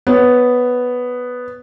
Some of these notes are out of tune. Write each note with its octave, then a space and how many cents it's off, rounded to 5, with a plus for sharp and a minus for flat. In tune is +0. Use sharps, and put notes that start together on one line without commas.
B3 +0 C#5 +0